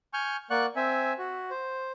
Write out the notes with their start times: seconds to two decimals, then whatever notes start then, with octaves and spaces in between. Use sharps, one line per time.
0.14 G#5 C#6 F6 G6
0.50 A#3 D5 F#5 C#6 F#6
0.76 C4 E5 G#5
1.19 F#4
1.51 C5